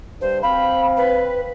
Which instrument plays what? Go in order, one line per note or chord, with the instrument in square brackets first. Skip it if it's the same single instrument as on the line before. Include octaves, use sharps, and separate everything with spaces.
[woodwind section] G2 [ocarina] C5
[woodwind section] C4 F5 [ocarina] B5
[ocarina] B4